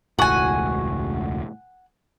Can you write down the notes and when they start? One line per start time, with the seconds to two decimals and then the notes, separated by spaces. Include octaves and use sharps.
0.19 E1 C#2 A2 F#4 F#5 G#5